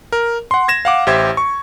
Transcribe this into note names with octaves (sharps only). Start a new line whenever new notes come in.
A#4
F#5 C6
G#6 A#6 E7
F5 F#5 D6
A1 G4 C5 E5 G#6
C#6